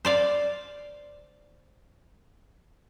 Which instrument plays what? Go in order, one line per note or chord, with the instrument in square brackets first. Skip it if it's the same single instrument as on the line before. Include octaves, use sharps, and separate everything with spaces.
[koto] C5 D5 F5